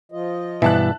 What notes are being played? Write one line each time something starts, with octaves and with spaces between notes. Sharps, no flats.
F3 F4 D#5
G2 B2 E3 E5 A5 F#6